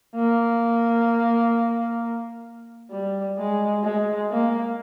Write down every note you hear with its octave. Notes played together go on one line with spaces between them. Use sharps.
A#3
G3
G#3
G#3
A#3